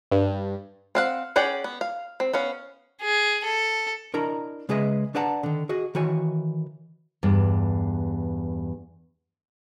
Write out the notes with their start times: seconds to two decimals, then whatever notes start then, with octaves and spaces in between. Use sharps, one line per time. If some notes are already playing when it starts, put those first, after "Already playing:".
0.11 G2
0.95 C4 F5 F#5
1.36 C#4 G#4 D5 F#5 G5
1.64 B3
1.81 F5
2.20 C4
2.33 B3 C#4 F5
3.02 G#4
3.44 A4
4.14 D4 E4 A#4 D#5 A#5
4.69 C#3 G#3 G#4 B4 D#5 E5
5.15 D4 B4 D5 F#5 A5 A#5
5.43 D3 D#3
5.69 F#4 G#4 D#5
5.95 D#3 E3 F#4 C#5 G#5
7.23 E2 G2